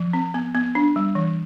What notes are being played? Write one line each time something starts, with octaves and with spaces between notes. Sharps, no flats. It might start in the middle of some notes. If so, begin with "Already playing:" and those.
Already playing: F3
C4
B3
B3
D4
G3
E3